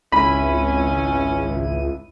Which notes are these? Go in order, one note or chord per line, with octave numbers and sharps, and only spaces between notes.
G#1 C#2 C#4 E4 B5 D#7